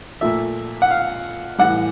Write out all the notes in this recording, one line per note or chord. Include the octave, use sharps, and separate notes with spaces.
A#2 F3 A3 E5
F#5
F5
A2 E3 G3 F#5